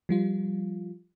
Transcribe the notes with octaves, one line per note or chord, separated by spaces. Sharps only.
F3 G3 F4